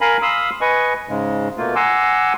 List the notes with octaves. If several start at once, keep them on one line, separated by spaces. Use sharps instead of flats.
A#4 F5 G#5 A#5 B5
F5 B5 C6 D#6 E6
B4 D#5 G#5 C#6
G#2 C#3 G#3
B2 A3 A#3 F4
F#5 G#5 A#5 C6 D6 E6